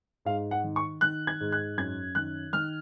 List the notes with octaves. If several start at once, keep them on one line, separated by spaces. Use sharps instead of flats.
G#2 F5
F#5
D#3
C#6
D#3 F#6
G#6
G#2
F#6
F#2 G#6
D#3 F#6
D#3 F6